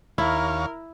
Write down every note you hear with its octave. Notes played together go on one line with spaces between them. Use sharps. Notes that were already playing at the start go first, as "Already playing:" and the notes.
D#2 E4 A#4 C#5 F5